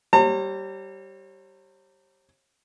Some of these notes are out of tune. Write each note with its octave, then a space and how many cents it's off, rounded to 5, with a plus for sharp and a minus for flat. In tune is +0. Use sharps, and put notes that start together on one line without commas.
G3 -15 C#5 -45 A#5 -45